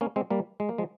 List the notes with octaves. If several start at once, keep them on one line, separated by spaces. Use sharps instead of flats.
A#3 C#4
G#3 C4
G3 A#3
G#3
A#3
F3 G#3